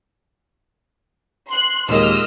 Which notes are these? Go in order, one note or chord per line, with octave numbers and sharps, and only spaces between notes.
C6 F#6
D#2 A#2 G#3 D#5 E6 F6